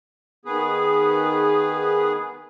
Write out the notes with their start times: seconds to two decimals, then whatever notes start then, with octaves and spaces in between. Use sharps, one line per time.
0.45 D#3 B3 G#4 B4